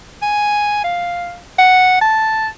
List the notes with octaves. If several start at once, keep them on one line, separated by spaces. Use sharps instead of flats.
G#5
F5
F#5
A5